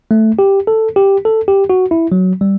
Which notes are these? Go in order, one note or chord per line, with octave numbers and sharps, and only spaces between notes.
A3
G4
A4
G4
A4
G4
F#4
E4
F#3
G3